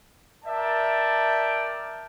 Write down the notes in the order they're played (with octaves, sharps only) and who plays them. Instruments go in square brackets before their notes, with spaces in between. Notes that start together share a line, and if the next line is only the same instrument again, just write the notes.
[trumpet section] A#4 D5 E5 G5 A5